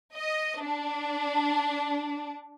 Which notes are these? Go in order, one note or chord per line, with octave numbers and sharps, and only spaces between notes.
D#5
D4